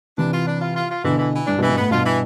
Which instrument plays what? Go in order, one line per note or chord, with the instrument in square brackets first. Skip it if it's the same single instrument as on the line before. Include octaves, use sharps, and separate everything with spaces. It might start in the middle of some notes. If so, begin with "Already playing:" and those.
[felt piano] C3 E3 [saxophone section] D4
[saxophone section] F4
D4
F4
F4
F4
[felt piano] B2 D3 [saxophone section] E3
[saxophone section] E3
E3
[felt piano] G2 [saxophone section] D4
[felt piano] G2 B2
[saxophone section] E3
[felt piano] G2 B2
[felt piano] A2 [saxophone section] B3
[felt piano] G2 B2 [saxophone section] F4
[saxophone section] E3